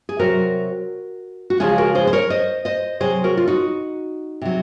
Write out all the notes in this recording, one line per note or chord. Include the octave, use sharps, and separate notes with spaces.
G#4
C3 F#3 F#4 A#4
F#4
C#3 F3 G#3 F4 G#4
F#4 A#4
G#4 C5
C5
A#4 C#5
C5 D#5
C5 D#5
C3 F#3 G#4 C5
F#4 A#4
F4
D#4 F#4
C3 F#3